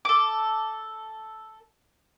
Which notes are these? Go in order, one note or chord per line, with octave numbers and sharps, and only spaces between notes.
A4 D6